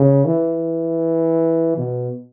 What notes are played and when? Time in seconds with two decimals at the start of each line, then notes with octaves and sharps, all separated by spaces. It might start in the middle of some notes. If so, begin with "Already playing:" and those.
Already playing: C#3
0.26 E3
1.77 B2